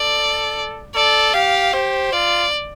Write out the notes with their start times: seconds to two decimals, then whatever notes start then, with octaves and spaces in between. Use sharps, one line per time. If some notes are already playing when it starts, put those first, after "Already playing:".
Already playing: A4 D5
0.95 A4 D5
1.34 G4 F5
1.73 G4 C5
2.12 F4 D5